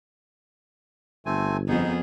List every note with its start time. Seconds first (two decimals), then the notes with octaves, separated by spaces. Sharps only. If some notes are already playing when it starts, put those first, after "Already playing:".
1.26 G1 A3 C4 G#5
1.68 F2 B3 D#4 G#4